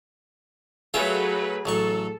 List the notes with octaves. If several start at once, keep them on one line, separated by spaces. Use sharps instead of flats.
F#3 A3 F4 G#4 B4 C#5 E5
A1 F#3 A4 C#6